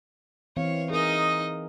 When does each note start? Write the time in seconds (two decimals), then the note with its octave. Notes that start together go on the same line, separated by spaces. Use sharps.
0.57 E3 C4 C#5 F5
0.90 D#4 G#4 A#4 D#5